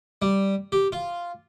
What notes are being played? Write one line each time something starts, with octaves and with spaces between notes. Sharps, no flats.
G3
G4
F4